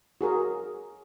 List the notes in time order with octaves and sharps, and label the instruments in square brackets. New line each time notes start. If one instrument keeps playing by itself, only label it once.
[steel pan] F#4 G#4 A#4